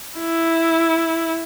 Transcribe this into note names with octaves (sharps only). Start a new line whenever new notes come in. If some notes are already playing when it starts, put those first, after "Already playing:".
E4